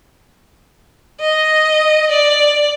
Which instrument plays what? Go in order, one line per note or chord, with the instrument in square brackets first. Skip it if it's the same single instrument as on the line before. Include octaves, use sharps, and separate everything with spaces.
[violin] D#5
D5